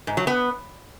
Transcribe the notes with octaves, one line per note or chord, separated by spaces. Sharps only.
G#2
F#3
B3